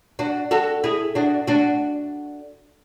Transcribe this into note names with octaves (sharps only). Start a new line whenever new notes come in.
D4 F#4
F#4 A4
E4 G#4
D4 F#4
D4 F#4